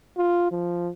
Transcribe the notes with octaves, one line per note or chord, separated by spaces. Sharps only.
F4
F3